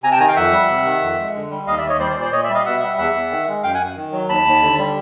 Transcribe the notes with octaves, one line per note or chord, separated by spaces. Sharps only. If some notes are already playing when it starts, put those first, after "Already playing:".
C3 G#5 A#5
G5 A5
D#3 G#5 A#5
F5 G5
F2 E5 F#5
G3
C3
D#3
F2
G#3
D3
G3
D#2 D#5 F5
D5 E5
D#2
C#5 D#5
G3 C5 D5
C5 D5
A#2
C5 D5
A#2 C#5 D#5
D5 E5
G3
D#5 F5
B2 E5 F#5
G3 E5 F#5
E2 E5 F#5
E2
D#3
G#3
F#2 F5 G5
F#5 G#5
F#2
D#3
F#3
D#2 A5 B5
D#2
D3
G3